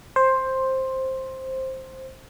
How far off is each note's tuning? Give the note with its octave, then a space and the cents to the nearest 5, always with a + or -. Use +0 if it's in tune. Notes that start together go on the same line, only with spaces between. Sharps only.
C5 +10